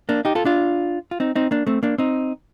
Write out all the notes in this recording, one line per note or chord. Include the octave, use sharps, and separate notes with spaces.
A#3 D4
D#4 G4
F4 A4
D4 F4
F4
C4 D#4
C4 D#4
A#3 D4
A3 C4
A#3 D4
C4 D#4